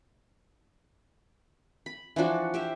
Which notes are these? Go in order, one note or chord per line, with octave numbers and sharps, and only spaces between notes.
B5
E3 F3 D4 F#4
G4 C5 E5